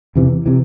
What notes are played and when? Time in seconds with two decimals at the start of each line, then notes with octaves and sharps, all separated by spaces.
0.15 E2 C3 E3
0.46 C3 E3